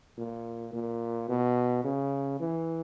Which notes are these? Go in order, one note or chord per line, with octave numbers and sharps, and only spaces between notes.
A#2
A#2
B2
C#3
E3